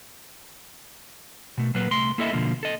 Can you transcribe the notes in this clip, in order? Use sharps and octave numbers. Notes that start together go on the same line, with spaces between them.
B2 A3
A#2 F#3 A#3 B4
C2 A3 C6
A#3 E4 A4 D#5 E5
B2 D3 F3 A#3
A4 D#5